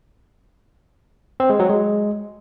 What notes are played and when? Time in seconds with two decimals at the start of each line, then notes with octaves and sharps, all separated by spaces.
1.40 C4
1.50 G#3
1.59 F#3
1.69 G#3